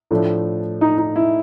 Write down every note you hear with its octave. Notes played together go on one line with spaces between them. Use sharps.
A2 F3 A3 D4
D#4
D#4
E4